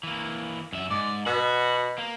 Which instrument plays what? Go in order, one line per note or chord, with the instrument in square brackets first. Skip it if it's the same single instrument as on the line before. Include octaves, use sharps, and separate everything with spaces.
[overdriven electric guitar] E3 A#3
F#2 E5
[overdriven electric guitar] G#2 [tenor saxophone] D5
[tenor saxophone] B2 [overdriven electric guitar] F#4
[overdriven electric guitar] A#3